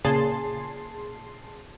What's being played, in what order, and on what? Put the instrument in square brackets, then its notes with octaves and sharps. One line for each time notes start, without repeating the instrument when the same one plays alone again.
[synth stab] A#2 C#3 G#4 A5 C6 C7